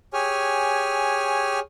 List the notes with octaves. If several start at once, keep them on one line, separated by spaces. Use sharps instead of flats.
G4 G#4 C#5 G#5 F6